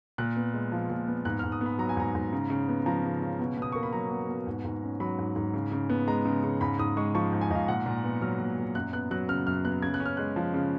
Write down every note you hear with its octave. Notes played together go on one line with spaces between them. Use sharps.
A#2 F#6
B3
G#3
F3
A#2
B3
G#2 F#6
G#2 F6
D#6
B3 B5
F#3 A#5
G#5
G#2 A#5
G#2
C#3
C#3
B3
F3 A#5
C#3
C#3
B2
B2 D#6
A#3 C#6
B5
F#3 A#5
B2
B2
G#2
G#2
C#4
F#3 B5
G#2
G#2
C#3
C#3
B3
G#3 A#5
C#3
C#3
G#2 B5
G#2 D#6
G#3 C#6
F3 C#6
G#2
G#5
G#2 D#5 F5
A#2 F#5
A#2
B3
F#3 F6
A#2
A#2
F#2 F#6
B3 F#6
F#3 F#6
C#3 F6
F#2 F6
B3 F#6
C#3 G#6
F#6
C#4
F6
G#3 F#6
F3
C#3